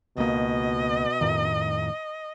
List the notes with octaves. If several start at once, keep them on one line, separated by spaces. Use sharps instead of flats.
C#2 B2 A#3 D#5
F2 A2 D#3